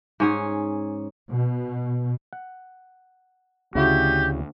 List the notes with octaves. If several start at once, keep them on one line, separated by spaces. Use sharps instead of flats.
G#2 C#4 G#4
B2
F#5
D2 C#3 E4 F#4 G4